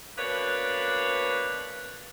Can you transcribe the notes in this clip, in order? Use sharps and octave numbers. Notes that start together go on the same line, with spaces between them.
B2 A#3 D4 B4 C#5